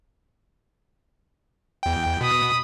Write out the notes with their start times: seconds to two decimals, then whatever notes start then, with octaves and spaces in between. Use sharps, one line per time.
1.83 E2 G5
2.21 B2 B5 D#6